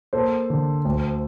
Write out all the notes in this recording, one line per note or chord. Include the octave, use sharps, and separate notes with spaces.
A#3 A4 C5
D3
D2